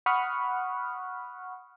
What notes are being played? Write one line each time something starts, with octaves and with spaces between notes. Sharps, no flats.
F#5 B5 C#6 D#6 F6 F#6